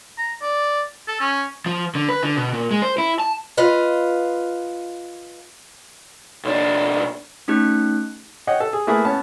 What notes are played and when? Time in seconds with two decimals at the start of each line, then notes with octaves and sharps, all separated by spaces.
0.18 A#5
0.42 D5
1.08 A4
1.20 C#4
1.66 F3
1.95 D3
2.09 B4
2.23 D3
2.37 B2
2.53 A#2
2.71 G#3
2.82 C5
2.98 E4
3.20 A5
3.57 F4 B4 D#5 F5
6.45 B1 D4
7.48 A3 C#4 D#4 G4 F#6
8.47 C#5 D#5 F#5 G5
8.60 A4
8.73 G#4
8.87 A3 A#3 E4 G#4 B4
9.05 B3 C#4 A5